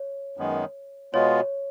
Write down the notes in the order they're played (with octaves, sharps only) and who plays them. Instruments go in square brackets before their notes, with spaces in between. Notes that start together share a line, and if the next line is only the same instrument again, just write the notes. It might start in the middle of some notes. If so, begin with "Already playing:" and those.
Already playing: [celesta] C#5
[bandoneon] F#2 D#3 G#3 B3
[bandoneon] B2 G#3 B3 F4 [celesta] C#5